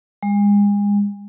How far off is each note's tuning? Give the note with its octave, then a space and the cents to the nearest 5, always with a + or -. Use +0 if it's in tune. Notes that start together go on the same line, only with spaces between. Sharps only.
G#3 -35